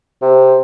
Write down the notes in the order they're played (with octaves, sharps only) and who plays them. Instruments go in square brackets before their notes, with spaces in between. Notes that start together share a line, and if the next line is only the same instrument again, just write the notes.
[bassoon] C3